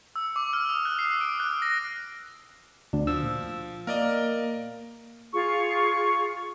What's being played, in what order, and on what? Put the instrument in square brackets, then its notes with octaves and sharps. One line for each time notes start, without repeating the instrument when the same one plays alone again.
[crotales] E6
D6
F6
D#6
F#6
C7
D7
F#6
A#6
[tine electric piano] D2 [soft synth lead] D4
[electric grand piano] F3 [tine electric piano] E6
[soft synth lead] A#2
[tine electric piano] A#3 [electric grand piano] A#4 D5 D#5
[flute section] F4 G#4 [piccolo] C#6